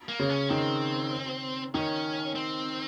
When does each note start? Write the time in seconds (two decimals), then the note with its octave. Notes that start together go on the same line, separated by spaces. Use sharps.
0.09 A#3
0.19 C#3
0.29 C#4
0.50 D#3 C4
1.74 D#3 C#4
2.36 C4